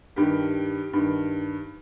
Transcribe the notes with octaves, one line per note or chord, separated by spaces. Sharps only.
G2 D#3 G4
G2 D#3